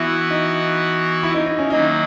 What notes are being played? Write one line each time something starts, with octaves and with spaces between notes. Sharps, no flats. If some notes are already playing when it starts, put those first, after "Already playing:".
Already playing: E3 B3 E4 F#4
D#4
E4
D#4
D#4
C#4
D#3 F#3 A#3 D#4